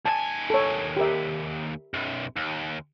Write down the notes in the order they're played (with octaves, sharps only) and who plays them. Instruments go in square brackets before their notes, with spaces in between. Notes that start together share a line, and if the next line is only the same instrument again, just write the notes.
[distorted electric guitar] D#2 G#5 [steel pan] A5
[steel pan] A4 C#5
G4 A#4 E5
[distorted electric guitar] B1 F#2
D#2